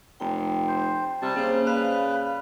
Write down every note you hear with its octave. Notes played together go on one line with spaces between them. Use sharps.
F1 G5
C5
C3 G3 A5
C#3 A#3 C#4 C5
B4 D5 F5